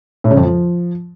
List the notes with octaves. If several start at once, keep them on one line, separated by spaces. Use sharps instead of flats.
A2
C#3
F2
F3